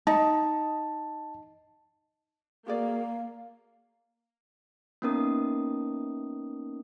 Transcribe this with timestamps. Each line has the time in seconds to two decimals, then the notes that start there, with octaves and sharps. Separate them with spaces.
0.07 D#4 A5
2.67 A#3 F#4 G#4 D5 F5
5.02 A#3 B3 C#4 D#4 A#4 D#6